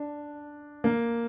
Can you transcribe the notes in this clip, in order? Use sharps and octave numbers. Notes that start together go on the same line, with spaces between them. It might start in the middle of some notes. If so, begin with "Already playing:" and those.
Already playing: D4
A#3